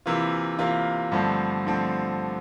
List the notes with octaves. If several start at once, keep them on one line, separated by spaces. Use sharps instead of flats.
C3 E3 A#3 F4
C3 E3 A#3 F4
G2 D3 F3 A3 C4
D3 F3 A3 C4